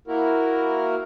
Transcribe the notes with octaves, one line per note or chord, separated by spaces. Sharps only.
A#3 E4 F#4 A#4